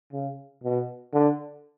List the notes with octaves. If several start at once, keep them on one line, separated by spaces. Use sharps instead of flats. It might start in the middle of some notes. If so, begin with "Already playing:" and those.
C#3
B2
D3